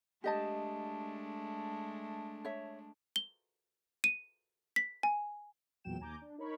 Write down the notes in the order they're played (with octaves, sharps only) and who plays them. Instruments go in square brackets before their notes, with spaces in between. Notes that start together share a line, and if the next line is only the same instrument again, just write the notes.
[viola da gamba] G#3 A3 D4 [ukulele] G4 D#5 A5
[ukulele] C#5 E5
[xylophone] G7
D#7
B6
G#5
[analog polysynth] A1 E2 A#2 F#3 G5 E7
D#2 G#5 A#5 D6 G6
D4
D#4 A#4 C#5 B5 C#6